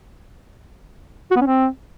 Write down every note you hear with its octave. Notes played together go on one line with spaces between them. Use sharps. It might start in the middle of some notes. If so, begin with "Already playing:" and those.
F#4
B3
C#4
C4